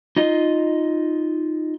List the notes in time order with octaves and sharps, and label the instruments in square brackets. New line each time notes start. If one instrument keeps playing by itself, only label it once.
[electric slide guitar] D#4 F4 D#5